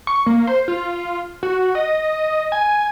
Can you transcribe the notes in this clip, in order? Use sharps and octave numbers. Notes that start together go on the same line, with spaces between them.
C#6
A#3
C5
F4
F#4
D#5
G#5